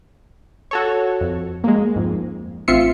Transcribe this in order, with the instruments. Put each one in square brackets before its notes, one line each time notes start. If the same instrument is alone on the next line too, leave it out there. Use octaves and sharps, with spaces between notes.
[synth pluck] F#4 A4 C#5
F2
G#3 A#3
F2 G#2
A1 C4 F4 E5 C7 C#7